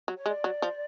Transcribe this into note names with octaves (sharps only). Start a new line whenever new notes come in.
F#3
C#5
G#3 D5
F#3
F3